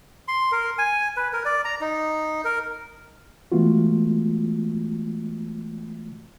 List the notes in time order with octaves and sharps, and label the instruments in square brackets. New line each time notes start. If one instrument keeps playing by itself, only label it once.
[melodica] C6
A#4
G#5
B4
A#4
D5
A#5
D#4
A#4
[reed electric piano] E3 G#3 A3 B3 F4 F#4